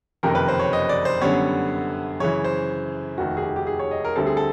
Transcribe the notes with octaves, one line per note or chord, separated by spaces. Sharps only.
F#1 F2 C3 D#3 A#4
B4
C5
C#5
D#5
D5
C5
F#2 D3 G3 B3 C#5
F#2 C#3 E3 C#5
C5
F1 D#2 D#3 F#4
G#4
G4
G4
G#4
C#5
D#5
A#4
D2 D3 G3 C4 A4
G#4
A4